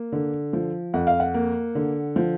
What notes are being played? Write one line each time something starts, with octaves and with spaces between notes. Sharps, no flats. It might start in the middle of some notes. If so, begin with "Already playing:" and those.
Already playing: A#3
D3
F3
F2 F#5
F5
F#5
A#3
D3
F3